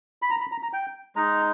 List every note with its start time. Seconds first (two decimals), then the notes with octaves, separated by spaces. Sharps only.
0.22 B5
0.31 A#5
0.41 B5
0.52 A#5
0.63 A#5
0.73 G5
1.16 G#3 D#4 A#5